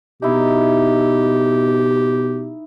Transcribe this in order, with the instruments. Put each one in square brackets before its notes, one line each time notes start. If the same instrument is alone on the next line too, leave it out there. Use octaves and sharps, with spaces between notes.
[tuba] B2 [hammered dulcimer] D#4 E4 [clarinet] G4